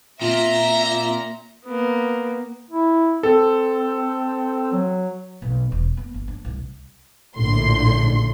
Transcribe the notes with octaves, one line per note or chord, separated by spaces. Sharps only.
A#2 C4 F4 E5 A#5
A#3 B3
E4
C4 A4
F#3
B1
E1
B3
G1
D4
C2
A#1 A2 D3 C6